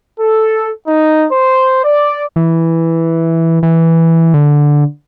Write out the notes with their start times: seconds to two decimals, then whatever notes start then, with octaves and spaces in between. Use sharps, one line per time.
0.18 A4
0.87 D#4
1.31 C5
1.84 D5
2.36 E3
3.63 E3
4.34 D3